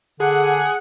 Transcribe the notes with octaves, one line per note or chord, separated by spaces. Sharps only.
D3 G#4 F#5